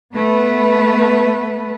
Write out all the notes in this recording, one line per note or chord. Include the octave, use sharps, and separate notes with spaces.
A3 B3 B4